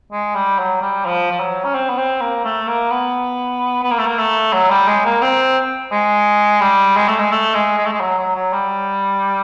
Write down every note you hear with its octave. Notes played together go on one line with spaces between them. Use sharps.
G#3
G3
F#3
G3
F3
F3
F#3
C#4
C4
B3
C4
A#3
A3
A#3
B3
B3
A#3
A3
A#3
A3
F#3
G3
G#3
A#3
C4
G#3
G3
G#3
A3
G#3
A3
G#3
G#3
A3
G#3
F#3
F#3
F#3
G3